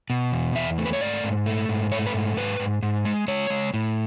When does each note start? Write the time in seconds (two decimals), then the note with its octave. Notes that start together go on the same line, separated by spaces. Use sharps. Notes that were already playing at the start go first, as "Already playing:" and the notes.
0.10 B2
0.32 E2
0.55 E2 E5
0.78 A3
0.86 B4
0.93 C#5
1.00 G#2 D5
1.24 G#2
1.46 A3
1.69 G#2
1.92 A3 C#5
2.07 B4
2.14 G#2
2.37 G#2 B4
2.60 G#2
2.83 G#2
3.05 G#3
3.28 G#3 C#5
3.50 G#3
3.74 A2